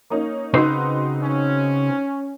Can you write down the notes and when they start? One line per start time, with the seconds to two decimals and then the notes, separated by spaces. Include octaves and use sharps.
0.10 A#3 C#4 D#4
0.54 C#3 C4 D#4 F#4 B4 C5
1.22 C#4